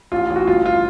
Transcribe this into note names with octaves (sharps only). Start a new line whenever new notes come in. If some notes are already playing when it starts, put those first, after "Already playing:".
A1 F4
A1
F#4
G1 F4
F4